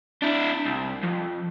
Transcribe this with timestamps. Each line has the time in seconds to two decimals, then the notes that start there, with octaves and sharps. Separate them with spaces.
0.22 D4 E4
0.66 C2
1.03 F2